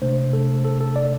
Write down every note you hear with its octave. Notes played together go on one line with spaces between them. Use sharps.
C3 A3 D4 C5
A4
A4
A4
D5